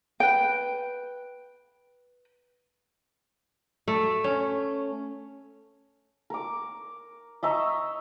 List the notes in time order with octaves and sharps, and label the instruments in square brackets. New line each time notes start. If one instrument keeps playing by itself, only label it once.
[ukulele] B4 G5
[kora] A3
C#4
[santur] A#4 D6
D#5 E5 A#5 C#6